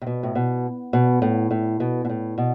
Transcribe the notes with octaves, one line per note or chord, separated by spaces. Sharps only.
C3
B2
A2
B2
B2
A2
A2
B2
B2
A2
B2